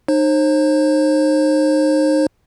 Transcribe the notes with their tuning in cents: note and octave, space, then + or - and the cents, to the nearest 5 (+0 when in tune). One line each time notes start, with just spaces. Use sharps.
D#4 -30 C5 +40